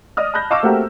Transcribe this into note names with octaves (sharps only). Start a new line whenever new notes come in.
D5 D#5 D#6 F6
A5 B5 F#6 G6 A#6
D#5 F5 A5 C#6 D6 E6
A3 A#3 C4 F#4 G4 A#4